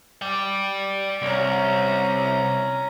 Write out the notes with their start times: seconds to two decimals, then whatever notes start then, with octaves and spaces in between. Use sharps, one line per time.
0.22 D5 G5
1.22 C2 C#4 A#5